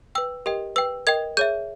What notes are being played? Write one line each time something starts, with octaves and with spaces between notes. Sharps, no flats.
B4 G5 E6
G4 A#4 D#5 G5
B4 G5 E6
A#4 D#5 G5 G#6
G#4 C#5 E5 G6